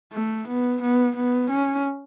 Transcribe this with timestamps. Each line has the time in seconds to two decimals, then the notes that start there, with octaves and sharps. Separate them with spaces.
0.13 A3
0.47 B3
0.82 B3
1.16 B3
1.50 C#4